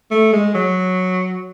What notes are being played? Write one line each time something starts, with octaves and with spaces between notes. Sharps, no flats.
A3
G#3
F#3